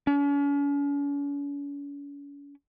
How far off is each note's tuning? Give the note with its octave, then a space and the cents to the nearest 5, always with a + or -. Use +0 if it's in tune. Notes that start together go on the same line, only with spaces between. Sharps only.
C#4 +45